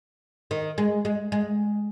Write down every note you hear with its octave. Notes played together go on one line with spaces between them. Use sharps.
D#3
G#3
G#3
G#3